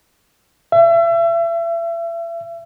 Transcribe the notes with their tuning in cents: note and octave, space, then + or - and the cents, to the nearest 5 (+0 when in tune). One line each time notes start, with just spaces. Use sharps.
E5 +35